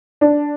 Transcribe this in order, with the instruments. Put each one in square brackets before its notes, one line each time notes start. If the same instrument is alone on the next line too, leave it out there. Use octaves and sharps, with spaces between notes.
[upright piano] D4